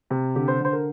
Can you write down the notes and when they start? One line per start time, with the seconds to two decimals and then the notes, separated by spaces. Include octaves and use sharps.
0.10 C3
0.35 D3 G4
0.48 C5
0.60 D3 C5
0.72 A#4